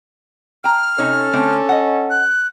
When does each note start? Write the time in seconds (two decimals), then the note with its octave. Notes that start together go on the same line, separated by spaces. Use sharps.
0.64 G5 A#5 F6
0.98 C3 C#4 D#4 A4 C#5
1.33 D3 A3 C4
1.69 D#5 F#5
2.10 F#6